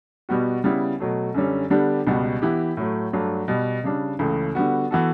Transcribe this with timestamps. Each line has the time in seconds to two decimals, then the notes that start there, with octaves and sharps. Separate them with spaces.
0.29 B2 G3 B3 F#4
0.64 C#3 G3 B3 E4
1.00 B2 F#3 A3
1.34 F#2 D3 G3 C#4
1.70 D3 G3 B3 D4 G4
2.07 C#2 B2 G3 B3 F#4
2.42 E3 B3 E4 G4
2.77 A2 F#3 A3
3.13 G2 F#3 A3 D4
3.48 B2 G3 B3
3.84 C#3 G3 D4
4.19 C#2 C#3 E3 A3
4.55 D3 G3 B3 F#4
4.91 E3 B3 F#4 A4